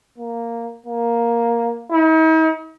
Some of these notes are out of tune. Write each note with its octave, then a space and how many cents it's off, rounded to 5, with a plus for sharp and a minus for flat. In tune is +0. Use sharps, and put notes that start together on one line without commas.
A#3 -5
A#3 +5
D#4 +45